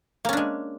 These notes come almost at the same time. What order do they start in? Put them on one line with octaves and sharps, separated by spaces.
A#3 C#4 D4 G#3